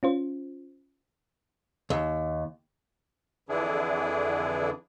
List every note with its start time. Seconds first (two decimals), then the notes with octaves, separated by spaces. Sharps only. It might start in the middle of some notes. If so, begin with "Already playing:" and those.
0.03 C#4 F4 C5
1.90 D#2
3.49 F2 D3 E3 D4 E4 G#4